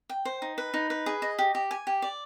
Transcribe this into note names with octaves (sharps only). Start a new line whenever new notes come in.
G5
C5
D#4
B4
D#4
B4
G#4
D#5
G4
G4
G#5
G4
D5